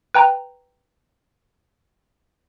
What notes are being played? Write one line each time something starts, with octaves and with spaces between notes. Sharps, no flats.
B4 G5 A#5